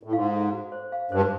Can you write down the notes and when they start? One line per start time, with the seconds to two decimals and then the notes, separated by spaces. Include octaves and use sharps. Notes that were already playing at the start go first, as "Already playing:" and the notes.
0.03 A2
0.13 G#2 F5
0.32 A4
0.53 F#4
0.72 C5
0.92 F5
1.11 G2 C5